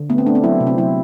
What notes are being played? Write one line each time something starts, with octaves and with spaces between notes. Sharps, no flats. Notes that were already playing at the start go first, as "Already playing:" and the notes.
Already playing: D3
A3 B3
C4
A3 D4
C4
F#3 E4
C3
C4
F#3 E4